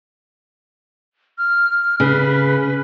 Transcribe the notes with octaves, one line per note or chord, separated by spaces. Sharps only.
F6
C#3 B4